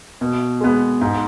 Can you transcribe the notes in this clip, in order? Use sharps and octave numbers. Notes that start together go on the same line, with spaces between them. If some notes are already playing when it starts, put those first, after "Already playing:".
B2
G#3 B3
G#2